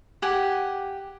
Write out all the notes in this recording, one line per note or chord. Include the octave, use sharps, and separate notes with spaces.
G4 F#5 G#5